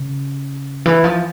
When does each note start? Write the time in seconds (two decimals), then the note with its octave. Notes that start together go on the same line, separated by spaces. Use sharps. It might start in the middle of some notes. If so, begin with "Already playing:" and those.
Already playing: C#3
0.86 E3
1.04 F3